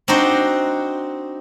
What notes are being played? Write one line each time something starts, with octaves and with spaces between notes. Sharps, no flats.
C4 D4 D#4 F#4 C5